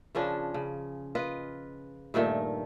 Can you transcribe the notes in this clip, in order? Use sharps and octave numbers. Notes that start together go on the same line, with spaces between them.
C#3 F3 C#4 D4
C#3
F4 B4 D#5
G2 A#2 D#3 A3